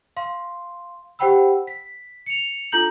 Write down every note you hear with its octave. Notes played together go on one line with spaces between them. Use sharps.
F5 C6
G4 C5 F#5 G5 B5 E6
B6
C#7 F7
D4 F4 A4 A#5 G6 F#7